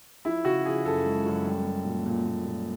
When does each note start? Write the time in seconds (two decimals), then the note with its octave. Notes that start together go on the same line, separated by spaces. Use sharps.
0.25 F3 E4
0.45 C#3 F#4
0.65 F3 G#4
0.86 F#2 A4
1.05 G#3
1.26 F#2
1.46 G3
1.65 G3
1.85 A#2
2.06 A#2
2.26 A#2
2.45 A#2